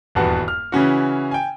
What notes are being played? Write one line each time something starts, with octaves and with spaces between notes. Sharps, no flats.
D#1 E2 G2 B3 F#4 A5
F6
C#3 E3 C#4 F#4
G5 G#5